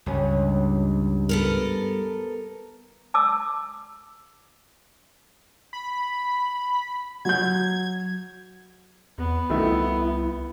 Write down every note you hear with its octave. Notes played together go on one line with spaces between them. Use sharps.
C#2 G2 C#4
B3 A4 A#4
A5 D6 E6
B5
F#3 G6 G#6
E2 B3
C2 D#3 A3 E4 E5